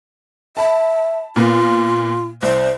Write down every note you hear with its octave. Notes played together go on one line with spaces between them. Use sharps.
E5 A5 B5
A#2 A#3 B3 F4
C2 C5